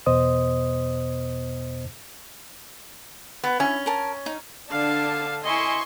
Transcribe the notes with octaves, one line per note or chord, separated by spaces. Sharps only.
E2 B2 B3 C5 D#5 D#6
B3
C#4 E4
A#4 A5
D#4
D3 D4 F5 A5
E4 D#5 G#5 C6 C#6